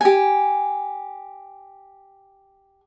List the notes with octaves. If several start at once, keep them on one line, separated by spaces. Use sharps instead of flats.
G4 G#5